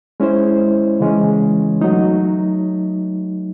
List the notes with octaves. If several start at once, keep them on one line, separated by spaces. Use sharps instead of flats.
G#3 C#4 E4 C5
C#3 E3 G#3 C#4
F#3 A3 D#4